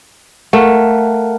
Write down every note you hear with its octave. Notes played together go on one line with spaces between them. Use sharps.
A3 A#4 F5 F#5